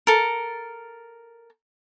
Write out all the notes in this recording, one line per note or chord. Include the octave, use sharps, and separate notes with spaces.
A4 A#4